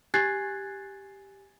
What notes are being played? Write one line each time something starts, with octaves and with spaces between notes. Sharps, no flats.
G4 G#5 F#6 G#6 A6 C7